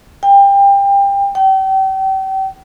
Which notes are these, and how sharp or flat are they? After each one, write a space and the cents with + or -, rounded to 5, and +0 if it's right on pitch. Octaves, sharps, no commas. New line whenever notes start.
G5 +25
G5 -35